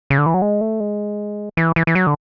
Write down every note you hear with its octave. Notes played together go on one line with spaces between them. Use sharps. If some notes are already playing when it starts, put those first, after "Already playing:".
C#3
D3
E3
F#3
G#3
A3
G#3
E3
E3
E3
F#3
D3